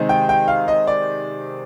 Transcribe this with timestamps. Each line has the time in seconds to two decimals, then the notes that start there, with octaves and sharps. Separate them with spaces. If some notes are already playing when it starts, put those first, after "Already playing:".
Already playing: C3 D#3 G#3 C4 D#4
0.09 G5
0.29 G5
0.48 F5
0.68 D#5
0.87 D5